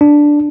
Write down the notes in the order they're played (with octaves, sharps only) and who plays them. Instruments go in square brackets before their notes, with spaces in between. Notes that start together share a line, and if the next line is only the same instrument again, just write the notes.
[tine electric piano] D4